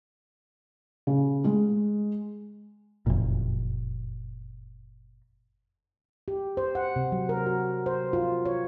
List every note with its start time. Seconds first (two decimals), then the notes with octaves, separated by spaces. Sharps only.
1.07 C#3
1.44 G#3
3.06 F#1 F2 A#2
6.28 G4
6.57 C5
6.75 F#5
6.96 C3
7.12 F#3
7.29 A#4
7.46 F#4
7.86 C5
8.13 F4
8.45 C#5